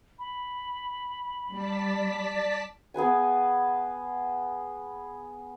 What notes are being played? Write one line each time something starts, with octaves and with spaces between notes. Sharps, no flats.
B5
G3 D5 A5 B6
B3 G#4 B4 G#5